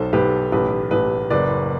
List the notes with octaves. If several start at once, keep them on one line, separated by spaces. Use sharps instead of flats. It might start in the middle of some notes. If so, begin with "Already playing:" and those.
Already playing: B1 A4 C5
B1 G4 B4
A1 G4 B4
A1 G4 B4
F#1 B4 D5